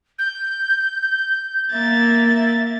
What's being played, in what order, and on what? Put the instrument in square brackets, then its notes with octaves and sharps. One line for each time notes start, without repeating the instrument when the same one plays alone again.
[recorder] G6
[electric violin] A#3 A6 [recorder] E5